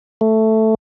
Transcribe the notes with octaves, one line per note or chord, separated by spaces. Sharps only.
A3